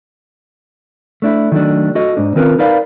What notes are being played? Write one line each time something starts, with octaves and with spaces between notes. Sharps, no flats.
A3 D4 E4
D#3 F#3 A3 D4
F#4 A4 D#5
G#2 D4
D#3 C4 C#4 F4 A#4 B4
D#4 A#4 B4 D5 F5